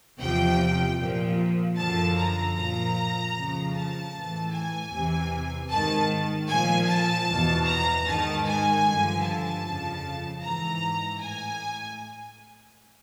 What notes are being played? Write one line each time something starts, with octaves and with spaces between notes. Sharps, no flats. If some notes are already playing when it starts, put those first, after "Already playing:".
E2 C3 F3 G5
A#2 F3
F#2 D3 F3 A5
A#5
A#2 F3 A#5
F2 C#3 F3
A5
A2 E3
G#5
E2 C3 E3
G#2 D#3 A5
A#2 F3 G#5
A5
E2 B2
A#5
G#2 D#3 A5
G#5
G2 D3 F3
A5
F2 C#3 F3
G#2 E3 A#5
A2 G#5